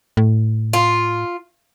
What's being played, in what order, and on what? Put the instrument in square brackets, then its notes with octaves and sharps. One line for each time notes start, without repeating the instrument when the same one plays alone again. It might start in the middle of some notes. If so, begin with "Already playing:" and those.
[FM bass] A2
[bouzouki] F4